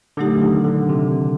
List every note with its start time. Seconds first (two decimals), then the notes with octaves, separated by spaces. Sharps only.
0.17 A#2 D3 F#3 A3 D#4 G4
0.42 D#3
0.64 D3
0.89 C3